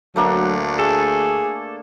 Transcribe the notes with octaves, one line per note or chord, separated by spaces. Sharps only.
D2 F#3 A3 A#3 D4
G#4 A4